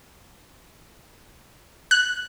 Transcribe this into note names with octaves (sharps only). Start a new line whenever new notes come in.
F#6